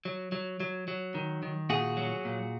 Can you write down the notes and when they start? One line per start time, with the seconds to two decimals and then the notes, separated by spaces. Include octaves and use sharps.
0.05 F#3
0.32 F#3
0.60 F#3
0.88 F#3
1.15 D#3
1.43 D#3
1.70 A#2 F#4 G#4
1.97 F#3
2.25 A#2